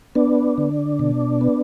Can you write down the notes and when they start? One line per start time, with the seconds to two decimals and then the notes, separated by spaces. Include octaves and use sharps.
0.15 B3 D4
0.58 D3
0.99 B2
1.41 B3